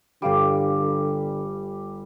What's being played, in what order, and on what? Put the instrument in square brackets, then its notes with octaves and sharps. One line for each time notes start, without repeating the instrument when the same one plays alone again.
[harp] G1 F5 D7 [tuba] D3 [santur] G3 G4